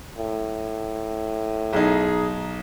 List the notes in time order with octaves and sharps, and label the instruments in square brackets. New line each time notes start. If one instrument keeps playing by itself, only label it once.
[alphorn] A2
[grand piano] B1 D#4 [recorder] G#4